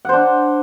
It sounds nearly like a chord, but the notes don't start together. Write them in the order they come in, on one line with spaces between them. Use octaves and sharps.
F#5 C5 D4